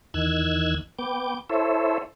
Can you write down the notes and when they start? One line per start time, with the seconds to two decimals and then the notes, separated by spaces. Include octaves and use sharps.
0.14 E2 D#3 E6 F#6 G#6
0.99 B3 G5 D6
1.50 E4 A4 C5 C#5 E5